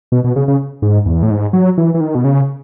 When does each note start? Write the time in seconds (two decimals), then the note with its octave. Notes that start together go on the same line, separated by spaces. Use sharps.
0.12 B2
0.24 B2
0.36 C#3
0.48 C#3
0.82 G#2
1.06 E2
1.23 A2
1.30 G#2
1.53 F#3
1.78 E3
1.94 E3
2.01 D#3
2.15 B2
2.24 C#3